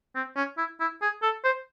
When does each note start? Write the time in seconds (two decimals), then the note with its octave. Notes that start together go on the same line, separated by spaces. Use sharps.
0.16 C4
0.36 C#4
0.58 E4
0.80 E4
1.02 G#4
1.23 A4
1.44 C5